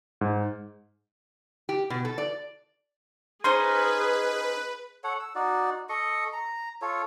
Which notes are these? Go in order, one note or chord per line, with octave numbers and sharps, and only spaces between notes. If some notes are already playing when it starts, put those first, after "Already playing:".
G#2
G4
B2
A4
D5
C#4 D#4 G#4 B4 C5 C6
A4 C#5 F#5
E6
D#4 F#4 D5
A4 D#5 C#6
A#5
F4 A4 C#5